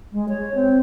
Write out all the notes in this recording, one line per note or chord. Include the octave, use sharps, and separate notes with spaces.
G#3
C#5
C4